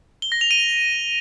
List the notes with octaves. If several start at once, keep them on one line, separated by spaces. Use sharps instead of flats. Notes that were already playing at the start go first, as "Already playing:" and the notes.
G7
A#6
F7
D#7